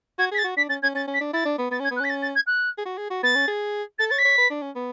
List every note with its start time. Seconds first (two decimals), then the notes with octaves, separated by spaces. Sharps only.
0.18 F#4 G#6
0.32 G#4 B6
0.38 A6
0.44 F#4
0.57 D4 B6
0.69 C#4 A6
0.82 C#4 G#6
0.95 C#4 A6
1.07 C#4
1.14 B6
1.21 D4
1.34 E4 A6
1.45 D4
1.58 B3
1.71 B3 A6
1.80 C#4
1.84 G#6
1.91 B3
1.96 F#6
2.00 C#4 B6
2.09 A6
2.22 A6
2.35 G#6
2.46 F#6
2.78 G#4
2.86 F#4
2.98 G#4
3.10 F#4
3.23 B3 A6
3.35 C#4
3.48 G#4
3.98 A4 A6
4.09 C#5 A6
4.18 B6
4.25 C#5
4.38 B4
4.50 D4
4.62 C#4
4.76 B3